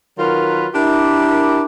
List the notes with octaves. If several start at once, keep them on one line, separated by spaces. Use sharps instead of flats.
D#3 F#3 F4 A#4 B4
D4 E4 G4 A#4